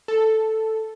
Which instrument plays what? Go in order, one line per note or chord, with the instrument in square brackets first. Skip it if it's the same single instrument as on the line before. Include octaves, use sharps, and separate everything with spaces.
[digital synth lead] A4